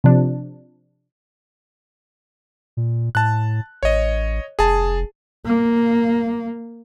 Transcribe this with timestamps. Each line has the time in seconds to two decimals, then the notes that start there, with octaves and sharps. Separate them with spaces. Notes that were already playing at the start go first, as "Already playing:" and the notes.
0.04 C3 F3 D4
2.77 A#2
3.15 A2 A5 F#6
3.83 A1 C#5 D#5
4.59 F1 G#4 A5
5.45 A#3